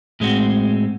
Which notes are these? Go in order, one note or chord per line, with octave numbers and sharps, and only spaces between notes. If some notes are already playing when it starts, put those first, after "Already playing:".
A2 G#3 C4 F#4